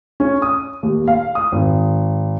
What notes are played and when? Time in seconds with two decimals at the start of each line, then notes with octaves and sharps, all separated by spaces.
0.20 C#4
0.42 D#6
0.83 D#2
1.08 F5
1.35 D#6
1.52 G#1